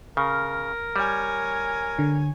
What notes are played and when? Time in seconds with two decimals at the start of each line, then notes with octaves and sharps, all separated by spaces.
0.17 C#3 A#4
0.96 G3 C#5 G#5
1.99 D3